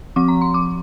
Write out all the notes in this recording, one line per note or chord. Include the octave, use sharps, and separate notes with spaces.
F3 C4 D6
A#5
C6
D6